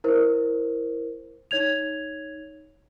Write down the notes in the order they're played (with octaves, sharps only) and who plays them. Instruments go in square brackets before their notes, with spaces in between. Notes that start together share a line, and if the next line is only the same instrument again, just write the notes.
[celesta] E4 A#4 C5
D#4 C#5 G#6 F7